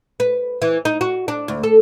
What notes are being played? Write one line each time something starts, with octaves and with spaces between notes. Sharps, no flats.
B4
E3
D#4
F#4
D4
D2
A4